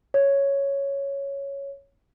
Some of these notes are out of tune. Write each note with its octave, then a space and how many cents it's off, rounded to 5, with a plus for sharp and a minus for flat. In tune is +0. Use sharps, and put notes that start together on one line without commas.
C#5 +0